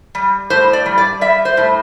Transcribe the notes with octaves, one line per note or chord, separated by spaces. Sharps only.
G3
A2 C5
D5
G3
D5
G3 E5
C5
A2